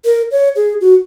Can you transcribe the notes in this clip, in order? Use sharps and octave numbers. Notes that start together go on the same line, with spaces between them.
A#4
C#5
G#4
F#4